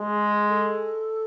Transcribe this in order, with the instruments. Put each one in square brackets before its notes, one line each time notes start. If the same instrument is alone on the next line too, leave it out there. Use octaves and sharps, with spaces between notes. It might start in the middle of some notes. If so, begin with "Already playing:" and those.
Already playing: [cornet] G#3 [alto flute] G#4
[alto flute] A4